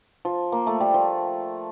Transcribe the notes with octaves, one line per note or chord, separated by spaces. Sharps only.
F3
A#3
A3
G3
F3